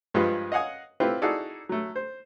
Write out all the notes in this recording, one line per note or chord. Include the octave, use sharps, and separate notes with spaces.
G2 F3 G#3 F4 B4
D#5 F5 F#5 G#5 D#6
C4 E4 F4 G4 B4
D#4 E4 F#4 G#4 A4 D5
F#3 A3
C5